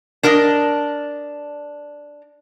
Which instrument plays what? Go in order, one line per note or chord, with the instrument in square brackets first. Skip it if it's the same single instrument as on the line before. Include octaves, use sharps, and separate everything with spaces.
[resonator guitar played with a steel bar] D4 A#4 D5 D#5